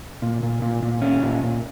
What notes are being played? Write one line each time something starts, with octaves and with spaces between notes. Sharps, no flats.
A#2
A#2
A#2
A#2
C#4
A#2
A#2